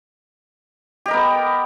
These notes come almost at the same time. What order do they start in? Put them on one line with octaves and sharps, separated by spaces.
G4 D#5 A#4 B3